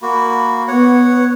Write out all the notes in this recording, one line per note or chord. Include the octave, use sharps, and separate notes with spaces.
A#3 F#4 B5
B3 C#5 F#5